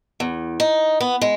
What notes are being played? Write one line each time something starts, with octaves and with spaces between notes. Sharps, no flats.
E2
D#4
B3
G#3